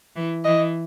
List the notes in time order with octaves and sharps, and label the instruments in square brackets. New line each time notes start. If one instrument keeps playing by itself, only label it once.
[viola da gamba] E3
[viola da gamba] E3 [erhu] D#5